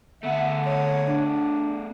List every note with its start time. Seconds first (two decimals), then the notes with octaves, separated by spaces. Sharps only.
0.23 D3 A3 B3 E5 F#5
0.66 C#5
1.08 D4